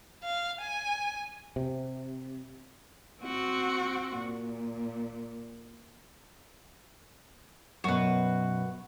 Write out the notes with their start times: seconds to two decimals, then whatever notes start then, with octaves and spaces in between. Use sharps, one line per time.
0.23 F5
0.61 G#5
1.56 C3
3.22 C4 F#4
4.18 A#2
7.84 F#2 B2 F#4 B4